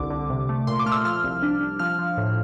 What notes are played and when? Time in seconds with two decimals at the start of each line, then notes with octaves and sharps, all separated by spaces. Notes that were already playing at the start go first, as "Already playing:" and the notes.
Already playing: C2 D3 D6
0.10 D3
0.30 C3
0.49 A3
0.67 A#2 C6
0.79 D6
0.86 A3 F6
0.92 E6
1.05 F3 F6
1.24 C2
1.43 D4
1.61 D4
1.79 F3 F6
1.99 F3
2.17 A2